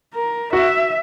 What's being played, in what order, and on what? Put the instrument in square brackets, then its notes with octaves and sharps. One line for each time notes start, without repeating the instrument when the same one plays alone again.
[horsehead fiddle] A#4
[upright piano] F#4 [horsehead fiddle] E5